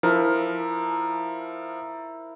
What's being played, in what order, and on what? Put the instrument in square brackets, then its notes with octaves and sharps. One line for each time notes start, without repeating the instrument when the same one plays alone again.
[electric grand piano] F3 [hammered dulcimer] E4 A#4